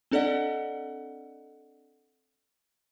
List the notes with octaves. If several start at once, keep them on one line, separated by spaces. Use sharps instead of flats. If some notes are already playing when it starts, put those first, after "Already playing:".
C4 D4 A4 D5 D#5 F#5